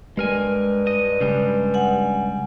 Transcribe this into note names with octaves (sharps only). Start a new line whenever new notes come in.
G2 G#3 A#4 G#5
D#5
C#3 G3 G#3
F#5 G#5